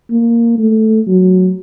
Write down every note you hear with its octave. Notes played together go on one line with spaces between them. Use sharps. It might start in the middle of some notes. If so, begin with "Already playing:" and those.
A#3
A3
F#3